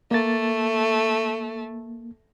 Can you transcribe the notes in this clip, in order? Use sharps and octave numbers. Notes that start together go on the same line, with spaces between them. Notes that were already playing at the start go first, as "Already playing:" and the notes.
A3 A#3 A6